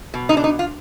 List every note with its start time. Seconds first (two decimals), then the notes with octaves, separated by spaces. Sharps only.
0.14 B2
0.29 D#4
0.37 D4
0.44 D#4
0.59 F4